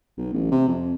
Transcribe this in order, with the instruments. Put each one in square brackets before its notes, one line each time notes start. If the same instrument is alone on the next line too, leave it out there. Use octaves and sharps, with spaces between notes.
[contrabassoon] B1
A1
C3
F2